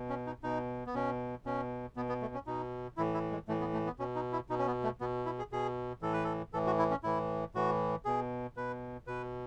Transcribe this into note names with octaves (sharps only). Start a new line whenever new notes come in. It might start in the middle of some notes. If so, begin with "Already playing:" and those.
Already playing: B2
C#4
D#4
B2 D#4
B3
B2 C#4
B2 C#4
B2 B3
B3
A3
C#4
B2 D#4
A2 E3 E4
E4
G#3
A2 E3 A3
B3
A3
B3
B2 C#4
D#4
E4
B2 D#4
C#4
B3
A3
B2 B3
E4
G#4
B2 G#4
A2 E3 A4
B4
A4
A2 E3 A4
F#4
E4
C#4
A2 E3 E4
A2 E3 F#4
B2 G#4
B2 B4
B2 B4